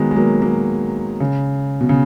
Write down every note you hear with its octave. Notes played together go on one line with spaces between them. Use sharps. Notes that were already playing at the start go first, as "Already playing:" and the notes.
Already playing: D#3 F#3 G#3 B3
G#3
F#3 A#3
F#3 A#3
C#3
B2
C#3